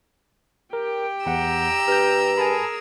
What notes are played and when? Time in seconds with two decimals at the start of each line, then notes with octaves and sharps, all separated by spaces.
0.73 G4 A#4 G5
1.26 E2 F#5 A#5 E6
1.88 G2 F6 G6
2.38 G#4 A#4 G#5 A5 B5